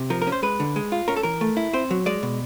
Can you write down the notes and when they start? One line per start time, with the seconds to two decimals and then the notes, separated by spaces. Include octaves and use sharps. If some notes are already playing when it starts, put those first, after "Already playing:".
Already playing: C3
0.10 F3 A#4
0.22 A#4
0.27 C#4
0.32 C5
0.43 G#3 B4
0.60 D3
0.76 G#3
0.92 F4
1.08 C#4 A#4
1.17 A4
1.23 E3 A#4
1.41 A3
1.57 E4
1.73 C4 C5
1.91 F#3
2.06 G#3 D5
2.23 B2